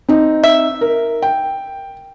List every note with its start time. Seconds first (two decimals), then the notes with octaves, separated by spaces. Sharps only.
0.09 C4 D#4
0.43 E5
0.81 A#4
1.22 G5